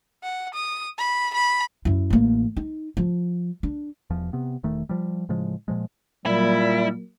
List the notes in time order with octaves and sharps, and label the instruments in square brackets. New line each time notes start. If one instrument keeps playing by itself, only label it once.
[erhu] F#5
D#6
B5
B5
[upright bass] F#2 E4
A1 A#3
D#4
F3
D4
[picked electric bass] E1 E2 F3
C3 B3
E1 D#3 A3
F3 G3
A2 C#3 F3 G#3
A#2 F3 G#3
[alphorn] A#2 [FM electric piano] F#3 A#3 [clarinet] G3 [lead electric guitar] E4